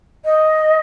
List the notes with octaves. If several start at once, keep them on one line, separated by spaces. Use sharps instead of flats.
D#5